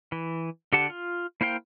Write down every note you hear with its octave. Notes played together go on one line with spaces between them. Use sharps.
E3
D3 G4 F#5 A5
F4
A#3 E4 C5 F5 G5